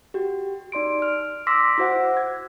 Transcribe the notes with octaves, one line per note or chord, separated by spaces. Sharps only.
F#4 G4
D#4 D5 C6 D7
F6
C6 D6 E6 A#6 B6
E4 F#4 C5 F#5
G#6